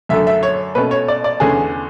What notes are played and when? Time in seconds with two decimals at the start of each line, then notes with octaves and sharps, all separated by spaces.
0.09 F#2 D3 A3 E5
0.27 E5
0.43 C#5
0.75 B2 A3 C#4 B4
0.91 C#5
1.08 D5
1.24 D5
1.40 E2 D3 A3 C#4 G#4